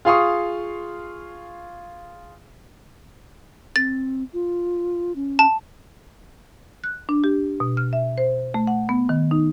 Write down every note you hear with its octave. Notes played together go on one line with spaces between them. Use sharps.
F4 G#4 F5 C6 C#6 D#6
C4 A6
F4
C#4
A5
F#6
D4
G4
B2
F6
E5
C5
A3
F#5
B3
D#3
D#4